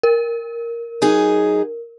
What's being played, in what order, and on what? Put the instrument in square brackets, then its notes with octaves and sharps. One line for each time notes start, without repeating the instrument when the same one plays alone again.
[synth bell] A#4
[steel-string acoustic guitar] F#3 D#4 G#4